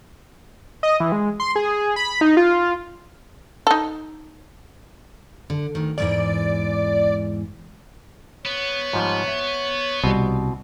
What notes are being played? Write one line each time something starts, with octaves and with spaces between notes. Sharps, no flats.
D#5
E3
G#3
C6
G#4
B5
D#4
F4
D#4 A4
D3
D2 D#3
E2 G#2 E3 D5
B3 C#5
G#2 F3 G3
E5
C2 B2 F3 G3 C4 G#5